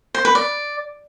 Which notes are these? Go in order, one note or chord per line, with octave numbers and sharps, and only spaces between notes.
C5
B4
D5